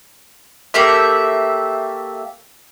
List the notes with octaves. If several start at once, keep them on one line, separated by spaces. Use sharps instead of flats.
A3 A#3 G4 E5